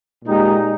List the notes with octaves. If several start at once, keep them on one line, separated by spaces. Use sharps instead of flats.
A#2 G#3 D#4 G4